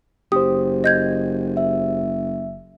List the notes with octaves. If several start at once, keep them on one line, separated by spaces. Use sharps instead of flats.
F#1 G4 C5 D#6
D#5 G6 G#6
E5